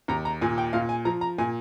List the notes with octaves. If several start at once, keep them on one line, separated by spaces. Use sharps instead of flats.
D#2 A#5
A#5
A#2 G#5
G5
A#2 F5
G#5
F3 A#5
A#5
A#2 G#5